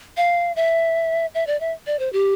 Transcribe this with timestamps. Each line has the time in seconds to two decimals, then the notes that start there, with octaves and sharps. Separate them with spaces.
0.17 F5
0.56 E5
1.35 E5
1.47 D5
1.60 E5
1.87 D5
1.99 C5
2.13 G4